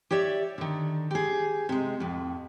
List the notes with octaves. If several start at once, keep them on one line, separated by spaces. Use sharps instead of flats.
G4 C#5 D5 E5
D3 D#3
G4 G#4
C3 G#3
F2 A2